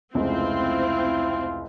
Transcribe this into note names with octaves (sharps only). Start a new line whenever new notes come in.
F1 C#2 C4 E4 F4